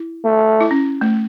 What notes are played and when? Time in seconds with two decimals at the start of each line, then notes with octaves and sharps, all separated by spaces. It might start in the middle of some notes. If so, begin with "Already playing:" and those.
Already playing: E4
0.24 A3
0.61 E4
0.71 C#4
1.01 A3